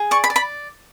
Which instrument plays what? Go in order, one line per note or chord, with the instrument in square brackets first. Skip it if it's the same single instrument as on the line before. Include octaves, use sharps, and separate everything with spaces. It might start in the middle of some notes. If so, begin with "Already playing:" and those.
Already playing: [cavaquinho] G#4
D5 C#6
B5
D5
B5